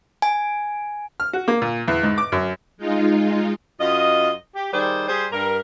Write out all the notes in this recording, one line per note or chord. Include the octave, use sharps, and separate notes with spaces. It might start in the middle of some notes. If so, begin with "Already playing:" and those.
G#5
F6
F#4
A#3
A#2
E2
G#2
D6
F#2
G#3 D#4 F4
F#2 F4 D#5
G4
D#3 G3 G#4 C5
G3 G#4 C5
G2 A#4